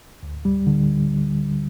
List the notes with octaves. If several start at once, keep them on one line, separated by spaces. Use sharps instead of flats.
D2
G3
D3